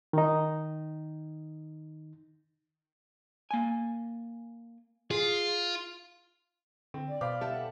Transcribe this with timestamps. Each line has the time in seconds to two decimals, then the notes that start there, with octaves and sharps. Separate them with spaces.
0.13 D#3 D#4
3.51 A#3 G#5
5.11 F4 G#4
6.94 D3 C4
7.08 D5
7.21 B2 C5 F5 B5 D6
7.41 G4 A4 E5 A5
7.54 F#5